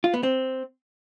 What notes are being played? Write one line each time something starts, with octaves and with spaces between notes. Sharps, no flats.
F4
B3
C4